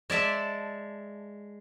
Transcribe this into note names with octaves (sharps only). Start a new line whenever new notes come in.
G#3 D5 E5 A5